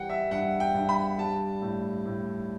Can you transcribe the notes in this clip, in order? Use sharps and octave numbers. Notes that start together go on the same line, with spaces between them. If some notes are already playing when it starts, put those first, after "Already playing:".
Already playing: E3 G3 F#5 G5
E5
G2 F#5
G5
G2
B5
G3 A5
A2
A2